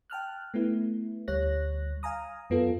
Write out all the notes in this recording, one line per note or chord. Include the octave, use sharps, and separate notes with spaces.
G5 A5 F6 F#6
A3 B3 E4
D2 G3 C#5 F#6 A#6
F5 G#5 A#5 D#6
F#2 B3 F4 A4